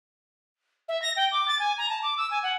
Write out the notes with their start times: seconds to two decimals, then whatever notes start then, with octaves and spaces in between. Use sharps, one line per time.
0.88 E5
1.02 A#6
1.16 G5
1.31 D6
1.48 A6
1.59 G#5
1.78 A#5
1.89 A5
2.03 D6
2.17 E6
2.31 G#5
2.43 F#5